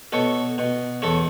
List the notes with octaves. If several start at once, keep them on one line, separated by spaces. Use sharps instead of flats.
B2 A4 C#5
B2
E2 A4 C#5